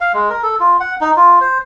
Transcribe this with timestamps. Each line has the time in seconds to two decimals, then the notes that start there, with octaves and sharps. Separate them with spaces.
0.01 F5
0.14 G#3
0.30 A#4
0.43 A4
0.60 F4
0.80 F#5
1.01 D#4
1.16 F4
1.41 C5